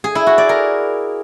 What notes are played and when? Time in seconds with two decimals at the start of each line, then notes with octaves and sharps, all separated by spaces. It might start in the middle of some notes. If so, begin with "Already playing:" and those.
0.04 G#4
0.15 E4
0.27 F#4
0.38 D5
0.49 A#4